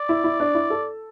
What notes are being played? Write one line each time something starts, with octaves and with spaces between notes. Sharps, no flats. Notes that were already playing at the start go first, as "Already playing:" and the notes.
Already playing: D5
E4
E4
D4
E4
A4